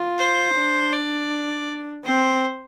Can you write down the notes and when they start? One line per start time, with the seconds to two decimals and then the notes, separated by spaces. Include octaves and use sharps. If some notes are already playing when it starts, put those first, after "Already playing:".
Already playing: F4
0.18 C5
0.55 D4
0.92 D5
2.05 C4 C5